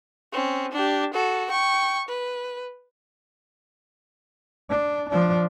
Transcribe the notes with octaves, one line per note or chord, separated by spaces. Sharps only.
C4 C#4
D4 G4
F#4 A4
G5 C#6
B4
D4
F3 D4